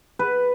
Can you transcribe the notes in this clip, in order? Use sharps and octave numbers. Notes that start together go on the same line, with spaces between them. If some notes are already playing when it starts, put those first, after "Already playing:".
B4